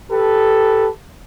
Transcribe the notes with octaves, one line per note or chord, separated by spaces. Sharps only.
G4 A4 B4